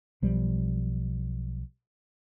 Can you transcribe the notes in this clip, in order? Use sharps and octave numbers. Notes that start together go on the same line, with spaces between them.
B1 F3 G3